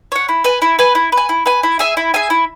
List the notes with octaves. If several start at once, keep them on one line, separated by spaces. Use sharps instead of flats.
C#5 F#5
E4
B4 G#5
E4
B4 G#5
E4
B4
G#5
E4
B4 G#5
E4
G#4 E5 G#5
E4
G#4 E5 G#5
E4